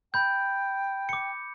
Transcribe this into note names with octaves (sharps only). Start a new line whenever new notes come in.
G5 B5 G6
D6 C#7